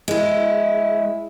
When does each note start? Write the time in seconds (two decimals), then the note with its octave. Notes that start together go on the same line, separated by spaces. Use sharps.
0.08 G#3 E4